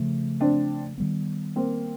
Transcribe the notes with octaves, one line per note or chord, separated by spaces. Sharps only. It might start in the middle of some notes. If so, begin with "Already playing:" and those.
Already playing: C#3 F3 A3
C4 D4
D#3 G3 B3
A#3 C4